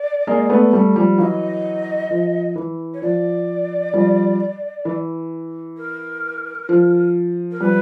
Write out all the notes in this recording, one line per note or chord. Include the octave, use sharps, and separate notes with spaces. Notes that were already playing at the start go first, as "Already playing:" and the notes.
Already playing: D5
G#3 A#3
A3 B3
G3 A3
F3 G3
E3 F#3 D#5 F5
F3
E3
C#5
F3 D5
F3 G3
E3
A#4
F3
A#4
F3 G3 B4